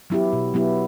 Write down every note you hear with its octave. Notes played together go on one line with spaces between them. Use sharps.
F#3 B3 E4 G4
B2
F#3 B3 E4 G4